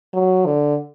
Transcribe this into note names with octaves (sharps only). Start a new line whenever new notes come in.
F#3
D3